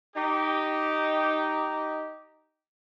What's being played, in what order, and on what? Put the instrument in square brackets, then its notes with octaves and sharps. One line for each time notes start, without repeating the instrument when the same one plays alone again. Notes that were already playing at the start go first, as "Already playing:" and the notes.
[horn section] D#4 G4